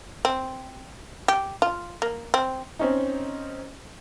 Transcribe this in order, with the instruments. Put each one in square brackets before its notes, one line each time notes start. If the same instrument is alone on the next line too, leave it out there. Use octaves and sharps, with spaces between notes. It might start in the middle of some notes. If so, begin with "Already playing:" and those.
[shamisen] C4
G4
F4
A#3
C4
[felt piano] C4 C#4 D#4